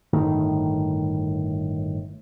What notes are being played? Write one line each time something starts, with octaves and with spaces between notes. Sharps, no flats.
G1 A2 D#3